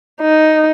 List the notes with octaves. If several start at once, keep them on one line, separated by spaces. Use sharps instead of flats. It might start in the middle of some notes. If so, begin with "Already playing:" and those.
D#4